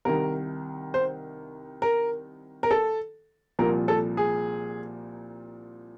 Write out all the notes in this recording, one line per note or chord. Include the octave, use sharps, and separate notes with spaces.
C2 C3 D#3 A#4
C5
A#4
A#4
A4
C2 A#2 F3 A#4
A4
G#4